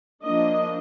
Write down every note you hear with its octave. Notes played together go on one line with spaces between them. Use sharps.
F3 A#3 D4 D#5